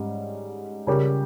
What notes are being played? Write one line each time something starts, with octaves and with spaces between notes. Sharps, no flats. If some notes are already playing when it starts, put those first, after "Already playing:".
Already playing: G#2 G3 C#4
C#3 G3 C#4 G4 A#4